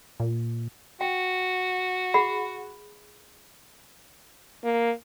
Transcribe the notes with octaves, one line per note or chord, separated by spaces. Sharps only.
A#2
F#4 G5
G#4 F#5 B5
A#3